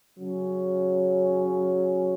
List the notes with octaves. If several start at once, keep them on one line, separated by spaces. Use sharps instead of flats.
C#3 F#3 C#4